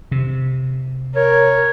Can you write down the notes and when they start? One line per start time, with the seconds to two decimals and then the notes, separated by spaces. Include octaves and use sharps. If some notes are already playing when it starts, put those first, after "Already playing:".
0.12 C3
1.16 A#4 C#5